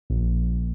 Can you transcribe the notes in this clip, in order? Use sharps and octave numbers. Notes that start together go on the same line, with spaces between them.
A#1